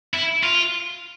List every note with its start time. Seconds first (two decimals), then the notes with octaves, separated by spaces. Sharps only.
0.14 E4
0.43 F4